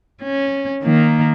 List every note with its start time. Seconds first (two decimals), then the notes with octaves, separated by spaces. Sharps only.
0.23 C#4
0.83 D#3 A#3